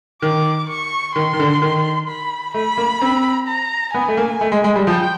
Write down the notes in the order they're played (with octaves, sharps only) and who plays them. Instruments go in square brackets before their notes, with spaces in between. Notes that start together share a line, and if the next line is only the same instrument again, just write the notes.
[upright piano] D#3 [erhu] D6
[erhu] C#6
[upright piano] D#3 [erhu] C6
[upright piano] D#3
D3
D#3
[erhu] B5
[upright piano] A3 [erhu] B5
[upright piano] A#3
C4
[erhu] A#5
[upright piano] B3 [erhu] G#5
[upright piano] A3
A#3
A3
G#3
G#3
G3
[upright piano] F3 [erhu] G5